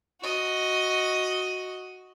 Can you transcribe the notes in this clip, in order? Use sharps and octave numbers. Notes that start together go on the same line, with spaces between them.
F#4 D#5